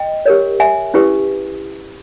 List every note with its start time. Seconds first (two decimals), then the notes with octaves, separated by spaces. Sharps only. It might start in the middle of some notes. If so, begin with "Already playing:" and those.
Already playing: D#5 G5
0.26 G4 A#4 C#5
0.60 E5 G#5
0.94 C#4 E4 G4 B4